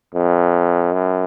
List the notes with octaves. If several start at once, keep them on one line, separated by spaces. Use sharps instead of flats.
F2
F#2